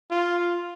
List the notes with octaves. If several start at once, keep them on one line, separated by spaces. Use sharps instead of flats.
F4